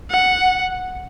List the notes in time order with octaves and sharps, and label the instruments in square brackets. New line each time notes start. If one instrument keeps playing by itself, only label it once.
[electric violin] F#5